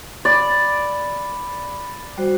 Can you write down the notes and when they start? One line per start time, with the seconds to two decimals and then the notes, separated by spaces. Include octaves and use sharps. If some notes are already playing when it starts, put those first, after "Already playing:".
0.25 D5 B5
2.17 G3 F#4 C5